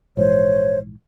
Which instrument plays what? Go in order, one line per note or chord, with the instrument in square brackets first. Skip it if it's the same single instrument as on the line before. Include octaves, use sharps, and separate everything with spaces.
[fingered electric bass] A#1 G#2 E3 [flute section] C5 C#5